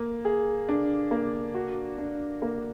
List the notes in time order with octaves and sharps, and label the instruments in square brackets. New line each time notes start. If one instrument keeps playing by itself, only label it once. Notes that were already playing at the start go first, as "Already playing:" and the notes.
Already playing: [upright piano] A#3
G#4
D4
A#3
F#4
D4
A#3